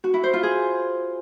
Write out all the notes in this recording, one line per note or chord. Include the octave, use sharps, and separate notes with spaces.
F#4
E4
C5
F4
G#4